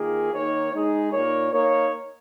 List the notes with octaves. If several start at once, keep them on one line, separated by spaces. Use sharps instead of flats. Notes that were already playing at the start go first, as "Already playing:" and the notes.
Already playing: D#3 A#3 F4 G#4
D#3 A#3 D#4 C#5
G#3 D#4 G#4
A#2 A#3 D#4 A#4 C#5
A#3 D#4 A#4 C#5